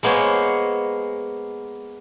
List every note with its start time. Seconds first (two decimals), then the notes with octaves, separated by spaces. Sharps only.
0.03 G#3 A#3 B3 C5 C#5